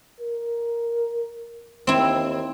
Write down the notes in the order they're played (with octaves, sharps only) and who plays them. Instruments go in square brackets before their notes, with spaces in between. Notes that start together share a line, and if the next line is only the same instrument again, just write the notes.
[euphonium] A#4
[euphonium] D#2 [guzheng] C4 E4